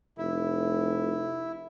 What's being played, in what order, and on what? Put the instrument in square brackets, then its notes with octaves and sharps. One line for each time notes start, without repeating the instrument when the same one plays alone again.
[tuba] F1 [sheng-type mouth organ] E4